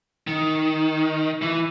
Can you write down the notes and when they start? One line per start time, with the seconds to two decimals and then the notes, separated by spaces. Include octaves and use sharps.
0.27 D#3
1.42 E3